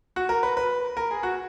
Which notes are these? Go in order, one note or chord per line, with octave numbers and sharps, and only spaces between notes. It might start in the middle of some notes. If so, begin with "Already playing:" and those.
F#4
A#4
B4
B4
A#4
G#4
F#4